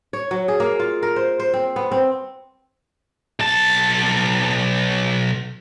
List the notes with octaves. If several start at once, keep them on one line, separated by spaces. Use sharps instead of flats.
C#5
F#3
G#4
A#3
F4
A#4
C5
C5
C4
B3
C4
B1 A5